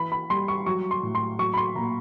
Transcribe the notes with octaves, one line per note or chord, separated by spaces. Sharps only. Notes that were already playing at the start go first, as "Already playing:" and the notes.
Already playing: E3 B5
B5
G3 C6
C#6
F#3 C#6
C6
A2
C6
F#3 C#6
B5
C6
A#2 A#5